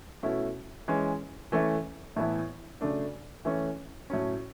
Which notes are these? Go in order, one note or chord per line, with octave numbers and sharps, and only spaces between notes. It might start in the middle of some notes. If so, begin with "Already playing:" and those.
B2 A3 C#4 E4
E3 G#3 C#4
E3 A3 C#4 E4
A2 E3 B3 E4
C#3 F#3 A3 D4
E3 A3 C#4
A2 F#3 C#4